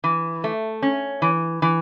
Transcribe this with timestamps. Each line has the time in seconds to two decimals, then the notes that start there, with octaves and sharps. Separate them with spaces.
0.04 E3
0.44 A3
0.82 C#4
1.22 E3
1.62 E3